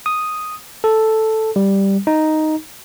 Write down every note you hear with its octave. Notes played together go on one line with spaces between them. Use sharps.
D#6
A4
G3
D#4